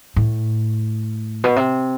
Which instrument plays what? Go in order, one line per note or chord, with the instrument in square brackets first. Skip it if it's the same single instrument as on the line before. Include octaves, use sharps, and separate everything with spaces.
[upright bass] A2
B2
C3